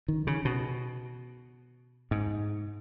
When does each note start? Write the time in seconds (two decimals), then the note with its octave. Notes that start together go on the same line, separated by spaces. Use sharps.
0.08 D#3
0.27 C#3
0.45 B2
2.11 G#2